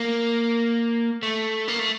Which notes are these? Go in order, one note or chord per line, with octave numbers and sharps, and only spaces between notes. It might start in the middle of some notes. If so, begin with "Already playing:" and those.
Already playing: A#3
A3
A#3
A3